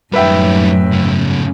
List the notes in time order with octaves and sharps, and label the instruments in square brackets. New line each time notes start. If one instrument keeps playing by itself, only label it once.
[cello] F#2 A2 [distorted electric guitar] D#3 G3 [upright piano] B4 E5 G5
[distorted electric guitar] G#2 C#3